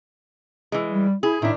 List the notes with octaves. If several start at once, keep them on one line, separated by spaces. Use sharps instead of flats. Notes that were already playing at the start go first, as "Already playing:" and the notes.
E3 G#3
G3
E4 G#4
A2 D#3 D4 E4 E5